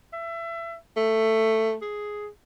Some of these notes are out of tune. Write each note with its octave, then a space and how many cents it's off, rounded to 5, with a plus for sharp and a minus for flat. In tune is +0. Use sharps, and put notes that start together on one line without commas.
E5 +25
A3 +10
G#4 +5